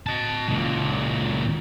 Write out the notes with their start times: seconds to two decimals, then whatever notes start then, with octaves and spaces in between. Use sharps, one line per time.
0.07 D#5 A5
0.48 C#2 A#2